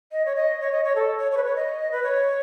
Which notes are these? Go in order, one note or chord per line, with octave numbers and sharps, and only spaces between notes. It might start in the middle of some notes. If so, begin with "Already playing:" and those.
D#5
C#5
D#5
C#5
D#5
C#5
A4
C#5
C#5
B4
C#5
D#5
B4
C#5